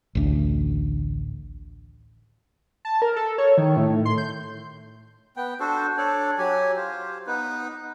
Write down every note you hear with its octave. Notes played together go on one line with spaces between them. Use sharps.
A1 D2
A5
A#4
A4
C#5
D#3
A2
C6
G6
B3 G5
D4 F#4 A4 C5
D4 A4 C#5 D5
F#3 G4 G#5
F4 G4 C5
B3 D#4 B4